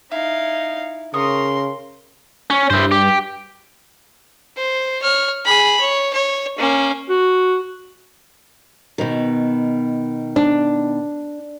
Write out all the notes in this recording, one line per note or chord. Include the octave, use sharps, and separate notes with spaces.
D#4 E4 F5
C#3 A#4 C6 C#6 D#6
C#4
G2 E4 C5
G4
C5
C#5 F6
G#4 B5
C#5
C#5
A#3 C#4
F#4
B2 D#3
D4